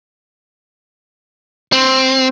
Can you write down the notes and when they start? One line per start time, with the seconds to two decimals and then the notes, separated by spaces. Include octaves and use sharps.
1.72 C4